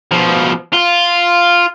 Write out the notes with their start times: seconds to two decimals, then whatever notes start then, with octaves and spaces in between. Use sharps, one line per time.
0.11 B2 F3
0.73 F4